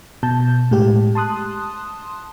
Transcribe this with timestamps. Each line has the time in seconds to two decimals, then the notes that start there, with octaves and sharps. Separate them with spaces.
0.23 B2 A5 G6
0.71 A2 G#3 G4
1.15 A5 C6 D#6 F#6